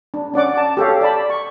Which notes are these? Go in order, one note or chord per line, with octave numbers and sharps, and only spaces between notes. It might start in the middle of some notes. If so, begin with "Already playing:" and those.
D4
C#4 D5 F#5 D6
A5
G4 A4 C#5 F5
D5 A5 B5
C#6